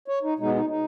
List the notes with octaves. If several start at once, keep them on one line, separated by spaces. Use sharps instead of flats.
C#5
D#4
B2 G#3 B3 D#4
D#4
D#4